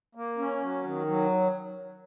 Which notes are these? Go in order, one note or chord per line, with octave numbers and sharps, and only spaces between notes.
A#3
C#4
F#3
D#3
F#3